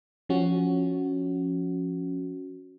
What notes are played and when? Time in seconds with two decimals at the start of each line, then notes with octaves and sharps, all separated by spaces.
0.29 F3 C#4 F#4